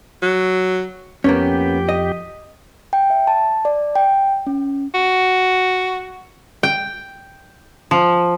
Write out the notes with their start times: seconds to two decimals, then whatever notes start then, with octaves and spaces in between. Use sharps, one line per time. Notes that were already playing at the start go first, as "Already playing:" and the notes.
0.22 F#3
1.24 F2 A#3 B3 C#4 G4
1.89 D#5
2.93 G5
3.10 E5
3.27 A5
3.65 D5
3.96 G5
4.47 C#4
4.95 F#4
6.63 G5
7.91 F3